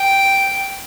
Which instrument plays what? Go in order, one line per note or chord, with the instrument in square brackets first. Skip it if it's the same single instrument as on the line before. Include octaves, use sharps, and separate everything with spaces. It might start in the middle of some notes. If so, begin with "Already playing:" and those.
Already playing: [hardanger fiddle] G5